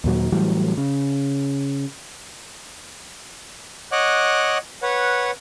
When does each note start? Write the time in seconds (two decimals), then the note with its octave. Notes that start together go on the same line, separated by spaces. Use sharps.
0.04 D#2 A#2 F#3
0.32 A2 E3 F#3 G3
0.77 C#3
3.92 C#5 D#5 F#5 D6 F#6
4.82 B4 C#5 F#5